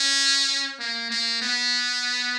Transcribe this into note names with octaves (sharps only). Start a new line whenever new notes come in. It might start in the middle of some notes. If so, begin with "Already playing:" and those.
Already playing: C#4
A#3
A#3
B3